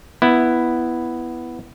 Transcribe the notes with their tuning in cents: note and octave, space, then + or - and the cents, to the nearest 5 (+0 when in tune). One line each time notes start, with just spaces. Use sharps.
B3 +0 E4 +0